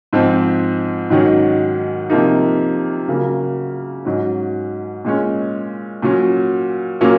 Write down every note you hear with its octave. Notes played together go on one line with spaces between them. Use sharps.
G#2 F3 C4
G#2 D#3 F#3 C#4
C3 F3 A#3 D#4
C#3 F#3 A#3
G#2 F#3 C#4
A#2 G#3 C#4
A#2 F#3 C#4
A#2 F#3 A#3 C#4